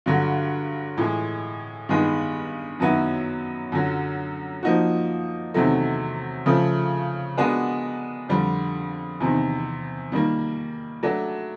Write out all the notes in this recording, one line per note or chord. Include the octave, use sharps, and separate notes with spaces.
G2 D3 F#3
A2 E3 G#3
G2 D#3 G#3 B3
F#2 D#3 F#3 B3 E4
F#2 D3 F#3
F3 A#3 D#4 F#4
E2 C3 D#3 F#3 A3
C#3 F3 A3
G#3 B3 D4 F#4 A#4
F2 D3 G3
E2 C3 D#3
D#3 G3 A#3
F#3 A3 D4